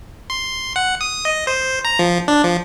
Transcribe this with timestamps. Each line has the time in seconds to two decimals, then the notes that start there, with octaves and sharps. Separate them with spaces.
0.30 C6
0.76 F#5
1.01 D#6
1.25 D#5
1.47 C5
1.85 A#5
1.99 F3
2.28 D4
2.44 F3